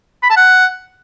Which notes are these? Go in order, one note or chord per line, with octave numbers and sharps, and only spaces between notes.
B5
A5
F#5